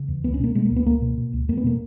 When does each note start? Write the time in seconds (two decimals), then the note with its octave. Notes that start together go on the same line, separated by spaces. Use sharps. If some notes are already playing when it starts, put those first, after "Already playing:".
Already playing: C#3
0.08 E2
0.24 C#2 B3
0.34 C#4
0.40 B2 A#3
0.55 B2 G#3
0.66 A#3
0.71 C#2
0.76 B3
0.86 C#2 A#3
1.01 B2
1.18 B2
1.33 C#2
1.48 E2 A#3
1.57 B3
1.64 B2 A#3